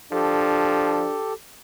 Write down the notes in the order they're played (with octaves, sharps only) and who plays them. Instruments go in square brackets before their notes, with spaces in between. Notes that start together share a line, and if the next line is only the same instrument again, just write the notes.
[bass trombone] F3 [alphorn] D4 [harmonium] G4 A4